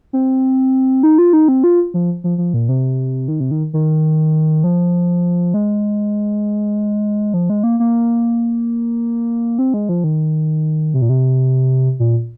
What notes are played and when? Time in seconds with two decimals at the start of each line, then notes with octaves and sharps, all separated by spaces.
0.13 C4
1.03 D#4
1.18 F4
1.33 D#4
1.48 C4
1.64 F4
1.94 F3
2.24 F3
2.38 F3
2.54 A#2
2.69 C3
3.28 D#3
3.40 C3
3.51 D#3
3.73 D#3
4.64 F3
5.54 G#3
7.34 F3
7.50 G#3
7.63 A#3
7.80 A#3
9.59 C4
9.74 G#3
9.89 F3
10.04 D#3
10.94 C3
11.02 A#2
11.09 C3
12.00 A#2